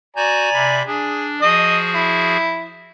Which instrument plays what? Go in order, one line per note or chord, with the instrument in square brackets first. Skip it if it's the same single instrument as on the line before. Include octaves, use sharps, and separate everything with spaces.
[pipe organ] F#4 G6 [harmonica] D5 G#5 A#5
[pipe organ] C3 E5 B5
[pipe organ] D4 [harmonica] G#4
[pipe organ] F3 F#4 G#4 [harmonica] D#5
[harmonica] E4